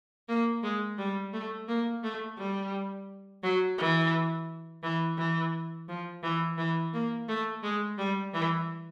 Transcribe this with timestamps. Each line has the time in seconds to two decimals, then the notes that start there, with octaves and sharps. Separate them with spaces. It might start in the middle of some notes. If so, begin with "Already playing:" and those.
0.28 A#3
0.63 G#3
0.98 G3
1.33 A3
1.68 A#3
2.03 A3
2.38 G3
3.43 F#3
3.78 E3
4.83 E3
5.18 E3
5.89 F3
6.23 E3
6.58 E3
6.93 A#3
7.29 A3
7.63 G#3
7.98 G3
8.34 E3